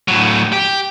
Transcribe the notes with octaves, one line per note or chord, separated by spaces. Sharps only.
A2 F#3
G4